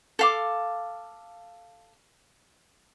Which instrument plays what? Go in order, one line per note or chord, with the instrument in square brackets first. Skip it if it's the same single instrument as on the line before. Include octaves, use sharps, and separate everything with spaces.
[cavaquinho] A4 F5 D6